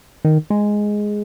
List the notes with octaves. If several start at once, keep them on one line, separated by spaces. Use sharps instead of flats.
D#3
G#3